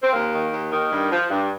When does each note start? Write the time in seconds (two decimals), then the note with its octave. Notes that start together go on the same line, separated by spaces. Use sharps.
0.03 C4
0.12 D#2 A#3
0.33 D#3
0.52 D#2
0.71 D#3
0.90 G2
1.11 F3
1.30 G2